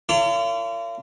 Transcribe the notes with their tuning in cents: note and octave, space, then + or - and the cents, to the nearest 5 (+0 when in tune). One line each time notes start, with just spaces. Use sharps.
F4 -40 A#4 -35 C#5 +40